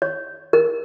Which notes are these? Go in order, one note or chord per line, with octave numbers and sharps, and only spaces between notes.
C#5
A#4